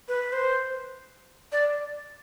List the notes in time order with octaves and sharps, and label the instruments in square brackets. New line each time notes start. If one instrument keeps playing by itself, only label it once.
[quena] B4
C5
D5